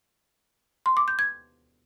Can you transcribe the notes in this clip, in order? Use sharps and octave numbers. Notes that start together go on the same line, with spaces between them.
C6
D6
G6
G#6